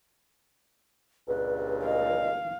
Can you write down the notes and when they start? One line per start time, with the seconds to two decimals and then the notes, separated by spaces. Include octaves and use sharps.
1.28 C#2 G2 A#2 B4
1.86 D#5 F5